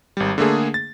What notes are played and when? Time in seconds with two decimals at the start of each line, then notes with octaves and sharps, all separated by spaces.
0.17 G#1 G3
0.38 D3 A3 A#3 G#4
0.74 A6